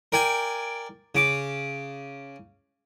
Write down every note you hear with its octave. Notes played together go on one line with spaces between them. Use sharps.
A#4 D5 G5 G#5
C#3 D6